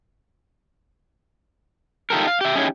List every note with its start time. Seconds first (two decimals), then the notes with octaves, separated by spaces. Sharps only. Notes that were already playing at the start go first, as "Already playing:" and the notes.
2.10 D#4 F4 G4 A4 A#4
2.28 F5
2.41 G4 E5
2.56 C#4 D#4 E4 G4 G#4 C#5